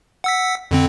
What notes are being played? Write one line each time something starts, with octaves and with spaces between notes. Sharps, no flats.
F#5 E6 B6
F2 D3 C4